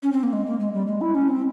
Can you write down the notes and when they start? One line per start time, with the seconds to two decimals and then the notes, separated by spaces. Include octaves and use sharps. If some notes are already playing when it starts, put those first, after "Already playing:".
0.03 C#4
0.12 C4
0.23 A#3
0.33 G#3
0.46 A#3
0.60 G#3
0.73 G3
0.87 G#3
1.01 E4
1.15 C#4
1.28 C4